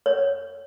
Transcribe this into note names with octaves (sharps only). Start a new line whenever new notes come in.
C#5